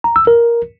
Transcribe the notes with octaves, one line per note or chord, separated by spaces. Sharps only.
A#5
E6
A#4